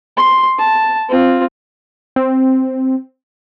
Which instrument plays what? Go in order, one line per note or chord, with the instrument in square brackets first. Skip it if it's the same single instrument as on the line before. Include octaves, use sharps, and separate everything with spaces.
[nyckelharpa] C6
A5
C4 F4
[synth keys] C4